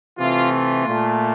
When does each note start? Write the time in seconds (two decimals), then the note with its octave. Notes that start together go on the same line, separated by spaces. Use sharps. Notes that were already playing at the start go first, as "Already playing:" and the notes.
0.18 C3 E3 A3 F4
0.51 F4
0.84 A#2 A3